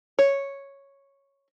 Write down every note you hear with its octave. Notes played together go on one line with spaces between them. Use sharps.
C#5